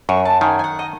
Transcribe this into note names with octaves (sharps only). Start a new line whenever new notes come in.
F#2 C#6
A5
D#3 G#5
G#5
F#5
D#5